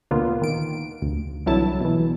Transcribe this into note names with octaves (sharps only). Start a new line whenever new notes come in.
D2 A#2 A#3 B3 F4
D#3 D7
D2
C2 D3 E3 F#3 E4 A5
B2 E3